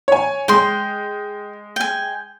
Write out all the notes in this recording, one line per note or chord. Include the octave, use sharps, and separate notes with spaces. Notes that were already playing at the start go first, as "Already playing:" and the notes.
C#5 G#5
G#3 G5 C6
G5 G#5